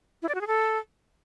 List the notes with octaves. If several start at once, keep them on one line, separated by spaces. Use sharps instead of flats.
E4
D5
F#4
G#4
A4